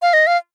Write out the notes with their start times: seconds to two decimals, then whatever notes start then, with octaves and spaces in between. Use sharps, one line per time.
0.02 F5
0.13 D#5
0.27 F5